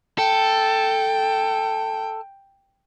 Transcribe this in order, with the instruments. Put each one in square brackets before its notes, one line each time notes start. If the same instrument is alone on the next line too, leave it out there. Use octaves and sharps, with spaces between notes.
[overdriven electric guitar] A4 [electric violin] G5